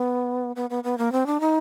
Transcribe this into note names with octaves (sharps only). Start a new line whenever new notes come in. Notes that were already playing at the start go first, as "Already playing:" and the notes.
Already playing: B3
B3
B3
B3
A#3
C4
D4
D#4